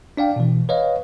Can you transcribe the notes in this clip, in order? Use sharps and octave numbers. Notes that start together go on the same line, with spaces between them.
D4 D5 F5 G5
B2 E3
B4 C#5 D#5 F5